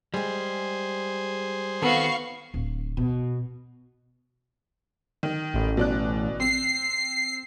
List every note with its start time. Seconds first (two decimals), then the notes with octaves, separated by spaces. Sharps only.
0.14 G3 G#3 G#4 C5
1.82 D#3 B3 C4 F#4 A4 F5 C#6 C7
2.54 D1
2.97 B2
5.23 D#3
5.53 A1
5.77 B2 D5 F#6
6.40 C4 C7